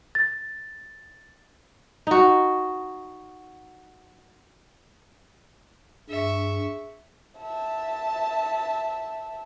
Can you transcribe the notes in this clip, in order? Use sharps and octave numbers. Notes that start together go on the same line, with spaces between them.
A6
D#4 F#4
G2 G#4 E5 C#6
E5 A5